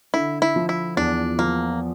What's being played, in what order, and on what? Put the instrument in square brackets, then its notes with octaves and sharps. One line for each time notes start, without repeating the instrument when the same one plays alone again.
[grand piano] D3 [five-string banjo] E4
[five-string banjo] E4
[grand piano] F3
[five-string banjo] E4
[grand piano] E2 [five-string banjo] D4
[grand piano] F3 [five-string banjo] A#3